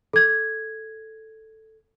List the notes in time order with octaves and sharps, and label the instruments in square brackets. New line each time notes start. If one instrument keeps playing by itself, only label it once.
[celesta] A4 G#6